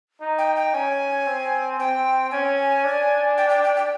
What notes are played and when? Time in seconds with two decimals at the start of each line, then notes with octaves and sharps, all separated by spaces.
0.21 D#4
0.38 G5
0.56 G5
0.74 C#4 G#5
1.27 C4
1.80 C4 G5
2.31 C#4 G#5
2.85 D4
3.38 G5
3.50 G5
3.64 G5
3.76 G5